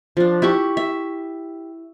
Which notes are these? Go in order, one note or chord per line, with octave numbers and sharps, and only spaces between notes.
F3 D4
E4 G4 C#6
E5